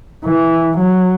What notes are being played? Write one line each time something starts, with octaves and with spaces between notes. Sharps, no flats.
E3
F#3